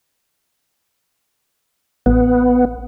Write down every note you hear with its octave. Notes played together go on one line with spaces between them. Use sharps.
A1 B3